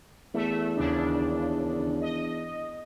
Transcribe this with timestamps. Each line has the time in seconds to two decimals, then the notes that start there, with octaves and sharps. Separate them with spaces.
0.34 E2 A3 E5
0.77 D#2 C#3 D4
2.01 D#5